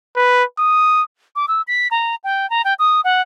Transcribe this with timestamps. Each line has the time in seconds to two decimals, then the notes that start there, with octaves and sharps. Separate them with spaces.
0.16 B4
0.59 D#6
1.36 D6
1.48 E6
1.67 B6
1.91 A#5
2.24 G5
2.50 A#5
2.65 G5
2.79 D#6
3.04 F#5